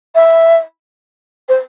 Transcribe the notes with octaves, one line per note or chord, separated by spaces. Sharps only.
E5
C5